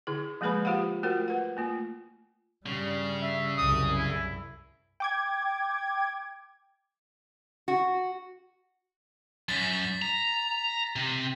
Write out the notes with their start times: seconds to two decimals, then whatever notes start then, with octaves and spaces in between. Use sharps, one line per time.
0.07 D3 E4 G#4
0.41 F3 G#3 A#3 G#4 B4 B5
0.65 F4 G4 C5 F5 F#5
1.03 A3 F4 F#4 A#4 C5 F#5
1.28 B4 F#5
1.57 A3 A#3 F4
2.66 G2 C#3 G3
3.22 E5
3.58 C2 F#2 D#6
3.96 E4
5.00 G5 D6 G#6
7.68 F#4
9.49 F#2 A6 B6
10.02 A#5
10.96 C3